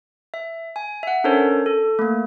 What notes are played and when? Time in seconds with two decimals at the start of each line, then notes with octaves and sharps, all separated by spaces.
0.34 E5
0.76 G#5
1.03 E5 F#5
1.24 C#4 D4 A4 A#4 C5 C#5
1.66 A4
1.99 A3 A#3